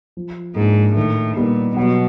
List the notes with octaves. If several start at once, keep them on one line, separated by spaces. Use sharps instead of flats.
F3
G#2 A#3 D4
A2 D#3
A#2 G3 B3 D#4
B2 F#3